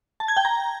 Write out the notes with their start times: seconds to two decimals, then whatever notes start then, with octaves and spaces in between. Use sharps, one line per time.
0.20 A5
0.28 G#6
0.37 G5
0.45 A#5